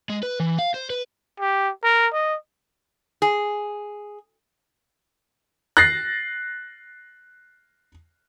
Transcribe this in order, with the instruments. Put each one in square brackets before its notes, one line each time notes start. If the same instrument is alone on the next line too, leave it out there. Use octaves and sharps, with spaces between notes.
[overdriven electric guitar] G#3
B4
E3
F5
C5
B4
[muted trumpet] G4
A#4
D#5
[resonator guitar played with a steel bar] G#4
[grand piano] F#6 A6 A#6 C7